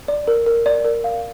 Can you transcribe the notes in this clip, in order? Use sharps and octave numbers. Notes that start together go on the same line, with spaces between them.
D5
A#4
A#4
D5
A#4
F5